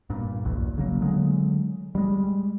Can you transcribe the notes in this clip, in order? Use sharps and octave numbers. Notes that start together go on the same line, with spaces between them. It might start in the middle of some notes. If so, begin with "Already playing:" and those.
G2 A#2
F#1 B1 E2
C#3 F#3 A#3
D3 F#3 G#3
G3 G#3